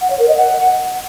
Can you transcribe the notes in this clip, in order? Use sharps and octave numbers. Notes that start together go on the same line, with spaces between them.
F#5
C#5
A#4
D#5
F#5